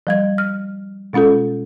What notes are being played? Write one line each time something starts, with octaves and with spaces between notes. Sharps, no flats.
F3 G3 G#6
F6
B2 G#3 C#4 F4 A4